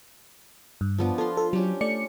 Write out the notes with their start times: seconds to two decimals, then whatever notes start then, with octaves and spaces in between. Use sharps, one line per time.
0.81 G2
0.98 F3 B3 D4
1.18 F4 A4 C6
1.37 A4
1.53 F#3 C#4 D4 G4
1.81 A3 D5 C#7